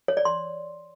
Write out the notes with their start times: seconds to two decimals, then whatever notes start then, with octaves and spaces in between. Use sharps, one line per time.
0.08 C#5
0.17 D5
0.25 C6